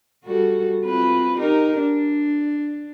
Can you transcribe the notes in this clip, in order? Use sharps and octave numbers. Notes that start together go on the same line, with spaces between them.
G3 F#4 A4
C4 F4 B4
D#4 G4 A#4
D4